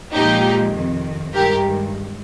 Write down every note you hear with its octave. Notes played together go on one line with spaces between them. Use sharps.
A#2 F3 G#3 D#4 G4
F2 C3 D#3
G2 D#3 G#3 G4 A#4